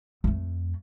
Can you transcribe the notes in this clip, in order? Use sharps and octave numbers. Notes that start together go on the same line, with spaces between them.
F2 A3